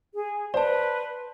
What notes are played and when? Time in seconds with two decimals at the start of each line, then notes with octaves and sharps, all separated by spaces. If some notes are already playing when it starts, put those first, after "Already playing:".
0.14 G#4
0.54 B4 C5 D5 A5